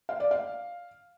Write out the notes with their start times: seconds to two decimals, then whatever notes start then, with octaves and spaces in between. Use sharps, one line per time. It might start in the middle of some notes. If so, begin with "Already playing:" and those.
0.09 F5
0.20 D5
0.31 F5